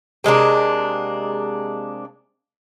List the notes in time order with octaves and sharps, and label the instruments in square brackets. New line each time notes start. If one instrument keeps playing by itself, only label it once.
[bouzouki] C3 G#3 A#3 D4